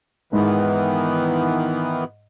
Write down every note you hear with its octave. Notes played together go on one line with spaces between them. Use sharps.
G#2 D#3 E3 B3